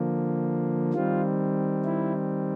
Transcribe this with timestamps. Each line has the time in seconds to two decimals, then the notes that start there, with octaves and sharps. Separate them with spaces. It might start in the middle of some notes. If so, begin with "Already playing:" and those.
Already playing: D3 F3 A#3
0.93 D#3 G3 C4 F4
1.85 E4